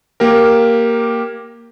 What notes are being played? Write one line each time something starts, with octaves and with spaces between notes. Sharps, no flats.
A#3 G4 A#4